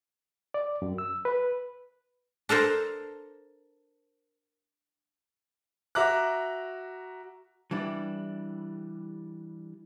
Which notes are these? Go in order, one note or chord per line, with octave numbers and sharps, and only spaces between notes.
D5
F#2
E6
B4
D4 A4 A#4 C5
F#4 E5 A#5 D6 F#6
E3 G3 D4 E4